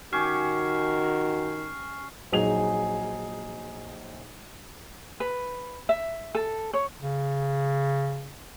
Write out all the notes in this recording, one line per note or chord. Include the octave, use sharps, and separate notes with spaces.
D#3 C#4 F#4 G4 C#6 F6 C7
A#1 F#3 D#4 G#4 G#5 F7
B4
E5
A4
C#5
C#3